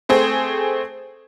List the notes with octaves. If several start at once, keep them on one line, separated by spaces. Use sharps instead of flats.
A3 C4 G#4 C5